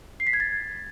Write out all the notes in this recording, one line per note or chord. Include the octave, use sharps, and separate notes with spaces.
C7
B6
G#6
A6